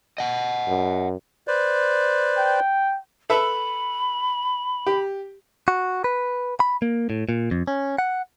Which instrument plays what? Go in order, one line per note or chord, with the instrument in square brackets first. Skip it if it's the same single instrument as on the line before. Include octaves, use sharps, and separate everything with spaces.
[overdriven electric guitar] D#5 F#5
[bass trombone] F#2
[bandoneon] B4 C5 D5
[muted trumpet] G5
[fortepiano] A4 B4 E5 [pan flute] B5
[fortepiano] G4
[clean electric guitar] F#4
B4
B5
A#3
A2
A#2
F2
C#4
F#5